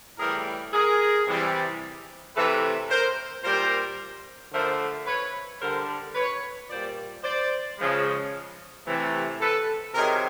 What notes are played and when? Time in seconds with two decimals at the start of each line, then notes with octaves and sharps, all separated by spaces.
0.18 A2 E3 G3 G#4 A#4
0.73 G#4 A#4
1.27 C3 E3 G3
2.35 C3 E3 A3 A4 B4
2.89 A#4 C5
3.43 A#2 G3 A#4 C5
4.52 D3 F3 A3 A#4 C5
5.06 B4 C#5
5.60 D3 G3 A#4 C5
6.14 B4 C#5
6.69 A#2 G3 C5 D5
7.23 C5 D5
7.78 C#3 F3 G#3
8.86 C3 E3 A3
9.41 A4 B4
9.94 C3 D#3 F#3 G#4 A#4